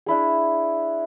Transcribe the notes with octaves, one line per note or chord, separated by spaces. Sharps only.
D4 E4 G#4